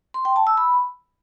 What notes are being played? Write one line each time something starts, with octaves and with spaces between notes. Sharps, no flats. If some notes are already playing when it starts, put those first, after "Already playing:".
C6
G5
A5
E6
B5